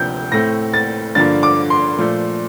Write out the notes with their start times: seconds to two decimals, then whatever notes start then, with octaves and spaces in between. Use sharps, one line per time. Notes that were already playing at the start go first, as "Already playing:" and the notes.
Already playing: D2 C3 F3 C4 G6
0.32 A2 A3 C4 A#6
0.74 A6
1.15 G2 D3 F3 A#3 A6
1.43 D6
1.70 C6
1.98 A#2 F3 A3